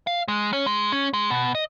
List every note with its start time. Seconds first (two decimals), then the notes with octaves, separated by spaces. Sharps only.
0.07 F5
0.28 G#3
0.53 C#4
0.66 G#3
0.92 C#4
1.14 G#3
1.30 B2
1.55 D#5